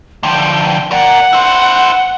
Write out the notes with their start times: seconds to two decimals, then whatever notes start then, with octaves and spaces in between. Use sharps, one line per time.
0.23 D3 F3 G5
0.91 A#4 D5 F#5
1.33 E4 C5